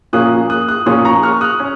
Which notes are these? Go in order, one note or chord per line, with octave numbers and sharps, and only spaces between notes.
A#2 F3 A#3 C#4 D#6 F#6
D#6 F#6
D#6 F#6
A#2 F3 A#3 C#4 C6 D#6
A#5 C#6
C#6 F6
D#6 F#6
C#4